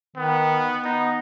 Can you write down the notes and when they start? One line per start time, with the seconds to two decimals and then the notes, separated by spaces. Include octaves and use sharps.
0.16 D#3 B3
0.84 B3 D#4